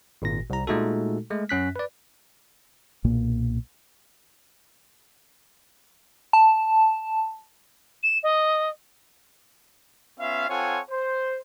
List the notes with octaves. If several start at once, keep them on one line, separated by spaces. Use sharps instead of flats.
G#1 A#2 A#6
C2 A#5
A#2 G#3 A3 D#4 F#4 A4
G#3 A3
F#2 C#4 F#6 B6
B4 D5
B1 A#2 A#3
A5
E7
D#5
B3 C#4 F4 E5 F5
C4 F4 A4 C#5 F#5 G#5
C5